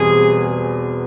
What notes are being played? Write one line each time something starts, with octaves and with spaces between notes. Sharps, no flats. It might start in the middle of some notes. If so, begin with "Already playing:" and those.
Already playing: E2 B2 G3 C4 G#4